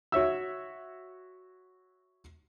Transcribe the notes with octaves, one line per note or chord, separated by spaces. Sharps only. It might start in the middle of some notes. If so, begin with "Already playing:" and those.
F#4 C#5 E5 E6